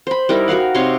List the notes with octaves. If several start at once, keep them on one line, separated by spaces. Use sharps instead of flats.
C5 B5
G3 D#4 E4 A#4
F#4 A#4 F5 F#5
C3 D#4 C#5 C6